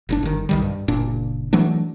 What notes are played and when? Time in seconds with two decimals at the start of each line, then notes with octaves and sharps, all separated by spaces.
0.09 G1 C#3 D4
0.23 G1 D#3
0.49 B1 D#3 G3
0.62 G2
0.88 F#1 A#2 D4
1.53 E3 F#3 A3 D4